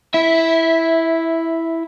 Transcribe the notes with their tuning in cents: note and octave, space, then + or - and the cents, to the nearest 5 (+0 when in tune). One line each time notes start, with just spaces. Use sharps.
E4 +0 E5 -15